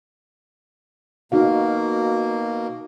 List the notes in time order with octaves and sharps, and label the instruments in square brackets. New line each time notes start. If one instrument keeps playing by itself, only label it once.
[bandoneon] B2 A#3 [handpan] D#4 F#4 F5